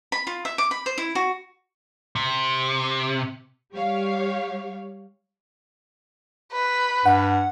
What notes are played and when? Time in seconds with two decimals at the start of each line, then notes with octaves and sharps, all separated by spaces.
0.12 B5
0.27 F4
0.45 E5
0.58 D6
0.71 B5
0.86 C5
0.98 E4
1.15 F#4
2.15 C3
3.72 G3 G4 C#5 F5
6.53 B4
7.06 G2 F#5